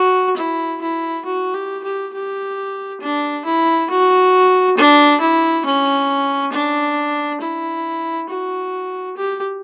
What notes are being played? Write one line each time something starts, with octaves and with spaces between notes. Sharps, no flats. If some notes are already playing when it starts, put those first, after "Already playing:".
Already playing: F#4
E4
E4
F#4
G4
G4
G4
D4
E4
F#4
D4
E4
C#4
D4
E4
F#4
G4